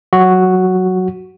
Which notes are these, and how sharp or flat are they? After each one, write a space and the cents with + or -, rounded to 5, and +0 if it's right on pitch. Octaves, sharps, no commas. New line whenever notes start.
F#3 +0 F#4 +0